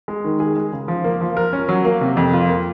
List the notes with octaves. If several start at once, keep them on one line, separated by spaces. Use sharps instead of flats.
G#3
D#3
G#4
G#3
C#3
F3
A#3
F3
A#4
C#4
F#3
A#3
C3
F2
F4
A#3